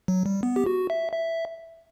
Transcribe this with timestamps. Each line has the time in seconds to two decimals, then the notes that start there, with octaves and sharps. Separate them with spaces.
0.08 F#3
0.26 G3
0.43 B3
0.56 G4
0.66 F#4
0.90 E5
1.13 E5